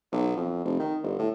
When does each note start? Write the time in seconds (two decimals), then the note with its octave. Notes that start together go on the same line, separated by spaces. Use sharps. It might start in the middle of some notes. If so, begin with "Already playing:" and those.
0.12 B1
0.36 F2
0.65 F1
0.79 D#3
1.03 G1
1.19 A2